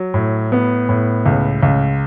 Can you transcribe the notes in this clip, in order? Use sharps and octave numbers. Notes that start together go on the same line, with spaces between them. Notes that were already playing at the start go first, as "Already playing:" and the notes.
Already playing: F#3
A2
B3
A2
C#2
C#2